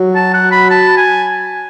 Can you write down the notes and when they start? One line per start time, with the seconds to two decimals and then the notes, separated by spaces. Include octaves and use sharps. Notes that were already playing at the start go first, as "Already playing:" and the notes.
Already playing: F#3
0.15 A5
0.34 F#5
0.51 B5
0.70 A5
0.97 G#5